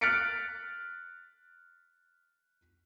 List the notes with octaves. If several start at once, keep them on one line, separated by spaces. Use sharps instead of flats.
F6 F#6 A6 B6 C#7 D7